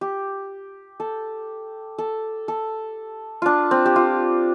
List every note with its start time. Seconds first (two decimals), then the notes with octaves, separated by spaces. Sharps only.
0.01 G4
1.00 A4
1.98 A4
2.48 A4
3.42 D4 F4
3.71 C4
3.86 G4
3.96 F4